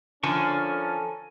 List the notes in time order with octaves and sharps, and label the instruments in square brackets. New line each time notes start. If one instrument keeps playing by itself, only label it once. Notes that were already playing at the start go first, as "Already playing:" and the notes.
[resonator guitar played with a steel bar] D3 F3 [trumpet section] C#4 A4 A#4 [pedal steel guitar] G#5 A5 C#6